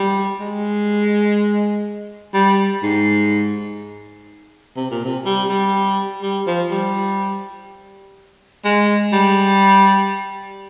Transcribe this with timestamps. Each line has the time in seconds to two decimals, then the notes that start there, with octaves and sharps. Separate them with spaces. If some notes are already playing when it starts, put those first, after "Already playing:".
Already playing: G3
0.40 G#3
2.34 G3
2.83 G#2
4.77 C3
4.91 A#2
5.05 C3
5.26 G3
5.49 G3
6.22 G3
6.47 F3
6.71 G3
8.65 G#3
9.13 G3